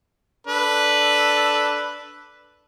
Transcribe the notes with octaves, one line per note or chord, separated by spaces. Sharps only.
D4 A4 B4